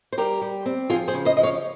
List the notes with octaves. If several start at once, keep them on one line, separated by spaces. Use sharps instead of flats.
C5
G3 G4 A#4
G3
C4
F3 F4 G#4
G#4 C5
C#3
C5 D#5
F3 D#5
C#5 F5